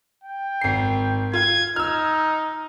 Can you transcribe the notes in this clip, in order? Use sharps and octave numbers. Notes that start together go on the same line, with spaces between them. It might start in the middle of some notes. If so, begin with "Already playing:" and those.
G5
G#1 C7
F4 G#6
D#4 E6 F6